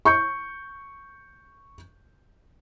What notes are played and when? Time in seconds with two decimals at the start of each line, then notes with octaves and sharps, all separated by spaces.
0.05 C#6 G6 C#7